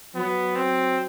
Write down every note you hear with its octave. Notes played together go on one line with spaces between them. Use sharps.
F#3 B3
C4